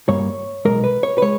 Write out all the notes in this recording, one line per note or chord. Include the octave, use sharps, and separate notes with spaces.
G2 G3 A#3 C#5
B1 B2 G#3 A#4
B4
C#5
B4
G#3 C#5